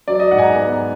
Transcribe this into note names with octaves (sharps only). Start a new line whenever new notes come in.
F#3 D5
D#5
G#2 F#5
G#5
A#5
B3